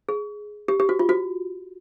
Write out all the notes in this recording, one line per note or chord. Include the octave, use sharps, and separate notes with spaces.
G#4
G4
G4
F#4
F4
F#4